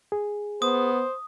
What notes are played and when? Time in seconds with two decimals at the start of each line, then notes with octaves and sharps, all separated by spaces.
0.12 G#4
0.62 B3 C5 D#6